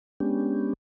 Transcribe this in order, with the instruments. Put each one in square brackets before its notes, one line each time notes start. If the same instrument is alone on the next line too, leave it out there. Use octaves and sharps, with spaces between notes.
[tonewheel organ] G#3 B3 C#4 D4 G4